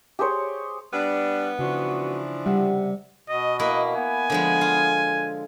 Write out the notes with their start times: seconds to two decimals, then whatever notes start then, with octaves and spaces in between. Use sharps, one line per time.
0.19 G4 G#4 C5 C#5
0.93 G3 B3 D4
1.59 C#3 E3 F3 D4 F#4
2.46 C3 G3 F#5
3.29 B2 D#5
3.59 A#3 E4 B4 D#5
3.96 B3 G#5
4.30 D3 F3 G#3
4.61 F4